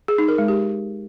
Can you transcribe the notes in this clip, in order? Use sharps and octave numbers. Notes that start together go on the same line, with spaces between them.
G#4
D#4
A#4
G#3
G4